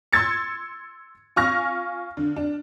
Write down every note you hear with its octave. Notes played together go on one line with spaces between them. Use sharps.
C6 E6 G#6 A6 C#7
F4 G#5 C#6 F6 A#6
D3
D4